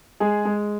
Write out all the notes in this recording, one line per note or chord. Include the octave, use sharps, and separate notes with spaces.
G#3 G#4
G#3